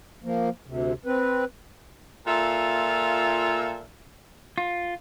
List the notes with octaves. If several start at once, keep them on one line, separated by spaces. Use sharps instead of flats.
F3 A#3
D2 C3
C4 B4
A#2 F4 A4 E5
F4